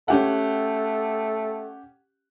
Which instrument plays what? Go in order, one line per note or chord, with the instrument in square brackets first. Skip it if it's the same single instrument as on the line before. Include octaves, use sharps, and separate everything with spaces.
[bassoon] A3 [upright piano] C#4 G4 F#5